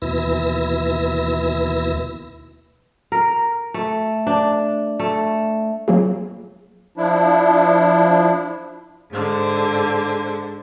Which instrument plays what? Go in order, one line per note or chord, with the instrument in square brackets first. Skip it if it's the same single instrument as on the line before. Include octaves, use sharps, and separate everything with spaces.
[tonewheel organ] D#2 B2 E3 E4 E6 A#6
[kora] A#4
A3
D4
A3
[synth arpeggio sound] F#3 A3 A#3 C4 F4 G#4
[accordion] F3 D4 E4
[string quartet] G#2 D3 C5